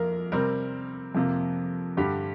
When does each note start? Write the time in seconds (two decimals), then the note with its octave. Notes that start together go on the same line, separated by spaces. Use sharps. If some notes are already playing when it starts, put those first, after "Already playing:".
Already playing: F2 A#3 A#4
0.32 C3 G3 C4 A#4
1.15 F2 C3 A#3
1.97 G2 D3 G3 G4